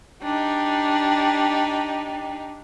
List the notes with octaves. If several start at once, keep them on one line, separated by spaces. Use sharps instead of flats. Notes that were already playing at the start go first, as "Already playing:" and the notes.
D4 D#4 G4